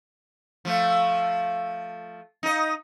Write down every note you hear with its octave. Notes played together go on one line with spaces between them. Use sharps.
F3 A3
D#4 D#5